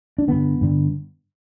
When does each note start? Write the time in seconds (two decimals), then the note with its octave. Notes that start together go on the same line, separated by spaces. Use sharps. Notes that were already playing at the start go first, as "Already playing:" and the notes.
0.18 D4
0.28 G2 D3 B3
0.61 G2 D3